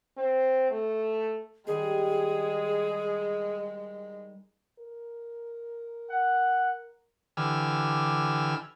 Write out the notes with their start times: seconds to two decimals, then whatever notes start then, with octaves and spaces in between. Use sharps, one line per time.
0.17 C4
0.71 A3
1.67 D#3 G3 G#3 G#4
4.79 A#4
6.10 F#5
7.37 D3 E3 G4 G#5 E6 F6